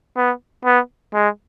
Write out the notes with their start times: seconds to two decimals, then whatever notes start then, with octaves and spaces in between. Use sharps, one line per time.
0.17 B3
0.65 B3
1.14 G#3